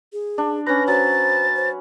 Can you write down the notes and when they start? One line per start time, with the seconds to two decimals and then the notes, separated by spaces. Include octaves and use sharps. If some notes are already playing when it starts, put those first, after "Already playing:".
0.13 G#4
0.38 D4
0.67 C#4 B4 A#6
0.88 F#3 C5 A6
1.56 C5